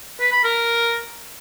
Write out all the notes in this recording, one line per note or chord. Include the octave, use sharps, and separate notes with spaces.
B4
B5
A#4